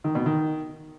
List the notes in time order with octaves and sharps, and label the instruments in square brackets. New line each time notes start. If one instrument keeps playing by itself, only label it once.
[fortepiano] D#3
B2
D#3